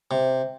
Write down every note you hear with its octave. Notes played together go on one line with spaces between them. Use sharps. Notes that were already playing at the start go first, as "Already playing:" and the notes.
C3